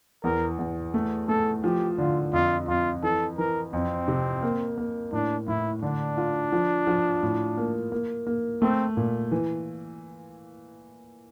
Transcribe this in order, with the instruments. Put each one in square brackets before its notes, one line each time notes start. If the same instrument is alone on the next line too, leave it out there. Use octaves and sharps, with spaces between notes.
[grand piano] E2 [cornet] A#4
[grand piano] E2
A3
[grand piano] A3 [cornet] A4
[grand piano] F3 [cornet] G4
[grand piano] D3 [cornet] F4
[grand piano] F2 [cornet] F4
[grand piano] F2 [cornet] F4
[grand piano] E3 [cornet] A4
[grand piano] E3 [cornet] A#4
[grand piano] F2 [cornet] C4
[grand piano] C3
A#3
A#3
[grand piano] A2 [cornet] D4
[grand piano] A2 [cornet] E4
[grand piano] D3 [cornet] D4
[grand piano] F4
F3
F3
A2
A#3
A#3
A#3
[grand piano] A3 [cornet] C4
[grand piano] A#2
E3